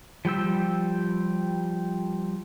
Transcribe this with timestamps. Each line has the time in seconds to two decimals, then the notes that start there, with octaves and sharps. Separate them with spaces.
0.25 F3 G3 G5 E6